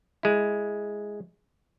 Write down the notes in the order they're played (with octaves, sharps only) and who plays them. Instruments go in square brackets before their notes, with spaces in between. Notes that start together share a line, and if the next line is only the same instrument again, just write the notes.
[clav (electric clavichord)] G#3 E4